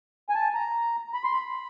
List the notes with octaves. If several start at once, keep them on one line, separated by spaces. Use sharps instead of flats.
G#5
A5
A#5
B5
C6
B5